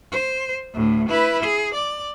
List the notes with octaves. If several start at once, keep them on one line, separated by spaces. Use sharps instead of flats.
C5
D2 A2
E4 B4
G#4
D5